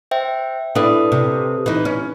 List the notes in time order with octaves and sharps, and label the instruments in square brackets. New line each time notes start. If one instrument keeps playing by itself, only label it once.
[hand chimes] C5 E5 G5
[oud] D4 E4 [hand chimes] A4 B4 D#6
[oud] C3
E3 D#4
C#4